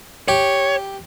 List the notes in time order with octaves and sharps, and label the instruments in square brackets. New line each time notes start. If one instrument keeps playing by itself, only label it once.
[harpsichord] G4 [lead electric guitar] C#5